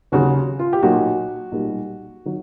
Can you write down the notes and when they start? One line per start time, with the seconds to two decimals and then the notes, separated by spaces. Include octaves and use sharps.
0.12 D#2 C#3 F#3 F#4
0.59 F4
0.73 G4
0.83 B1 A#2 F#3 F#4
1.52 B1 A#2 G3
2.25 D#3 F#3